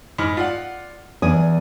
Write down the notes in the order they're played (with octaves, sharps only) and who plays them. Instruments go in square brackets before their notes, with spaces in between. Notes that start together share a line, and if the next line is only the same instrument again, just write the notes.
[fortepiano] G#2 B5 F6
F4 D5 F#5
[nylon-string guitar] E2 D5 G#5 [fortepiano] D#6